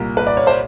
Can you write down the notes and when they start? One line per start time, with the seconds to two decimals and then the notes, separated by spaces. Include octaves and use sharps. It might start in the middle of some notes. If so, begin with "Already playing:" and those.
Already playing: C2 A#2 A#4
0.17 B4
0.27 D5
0.37 C#5
0.47 C5